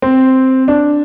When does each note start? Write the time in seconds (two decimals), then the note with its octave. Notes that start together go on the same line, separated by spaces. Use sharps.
0.02 C4
0.68 D4